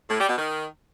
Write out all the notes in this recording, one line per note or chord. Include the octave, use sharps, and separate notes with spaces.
A2
G3
B2
D#3